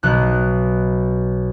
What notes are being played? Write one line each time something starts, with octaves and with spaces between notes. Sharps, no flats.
B1 F#6